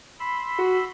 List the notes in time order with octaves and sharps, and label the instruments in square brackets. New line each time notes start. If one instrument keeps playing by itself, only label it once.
[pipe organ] B5 C6 E6
[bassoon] F#4